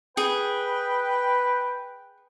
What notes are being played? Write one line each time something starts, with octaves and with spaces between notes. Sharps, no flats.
G#4 B4 G5